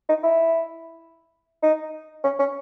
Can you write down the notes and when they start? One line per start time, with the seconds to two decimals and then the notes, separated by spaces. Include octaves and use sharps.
0.09 D#4
0.24 E4
1.63 D#4
2.24 C#4
2.39 C#4